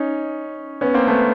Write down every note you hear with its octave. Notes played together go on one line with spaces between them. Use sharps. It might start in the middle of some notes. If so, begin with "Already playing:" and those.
Already playing: C#4 D#4
B3 C#4
A#3 C4
A3 B3